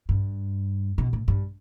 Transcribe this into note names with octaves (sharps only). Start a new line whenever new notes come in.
G2
B2
A2
G2